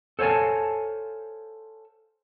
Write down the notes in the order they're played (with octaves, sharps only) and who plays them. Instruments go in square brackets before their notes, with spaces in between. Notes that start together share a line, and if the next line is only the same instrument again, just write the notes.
[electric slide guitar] A4 C5 C#5 F5 G#5 A5